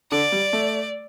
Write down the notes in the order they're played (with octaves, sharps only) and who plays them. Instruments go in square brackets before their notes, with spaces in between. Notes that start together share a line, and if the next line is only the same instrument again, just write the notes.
[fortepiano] D3 [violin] D5
[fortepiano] G3
A3